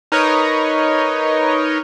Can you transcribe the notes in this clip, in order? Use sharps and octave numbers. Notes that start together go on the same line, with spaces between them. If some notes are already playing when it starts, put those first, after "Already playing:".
D#4 A#4 B4 C#5 D#5